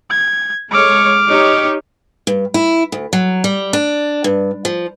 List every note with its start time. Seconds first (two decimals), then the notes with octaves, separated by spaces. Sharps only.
0.10 G#6
0.71 G#3 A4 C#5 D6 F6
1.28 D#4 G4 C#5
2.27 G2
2.54 E4
2.92 D2
3.13 F#3
3.44 G3
3.73 D4
4.24 G2
4.65 F3